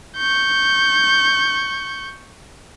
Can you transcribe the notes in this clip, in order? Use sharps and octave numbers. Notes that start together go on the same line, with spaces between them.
C#6 G6